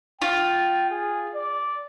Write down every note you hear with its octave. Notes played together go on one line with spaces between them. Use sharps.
F4 G5
G#4
D5